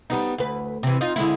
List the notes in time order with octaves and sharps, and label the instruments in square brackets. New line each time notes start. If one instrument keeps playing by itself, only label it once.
[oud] G3 B3 D#4
D2 B4
C3 E3
D#4 F4
D3 G#3 E4